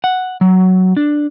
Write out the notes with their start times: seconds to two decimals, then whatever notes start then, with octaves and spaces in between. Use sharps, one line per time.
0.04 F#5
0.41 F#3
0.97 D4